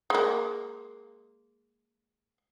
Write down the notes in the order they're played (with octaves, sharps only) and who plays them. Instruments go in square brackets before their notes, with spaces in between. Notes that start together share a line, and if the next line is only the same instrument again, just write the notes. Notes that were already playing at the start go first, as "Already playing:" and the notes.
[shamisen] G#3 A#3